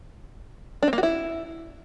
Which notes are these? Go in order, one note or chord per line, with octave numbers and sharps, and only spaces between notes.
D4
C4
A#3
F#4
E4